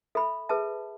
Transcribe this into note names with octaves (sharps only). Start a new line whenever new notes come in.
A4 E5 B5
G#4 B4 E5 A5